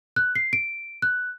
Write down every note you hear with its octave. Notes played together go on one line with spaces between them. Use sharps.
F#6
C7
D7
F#6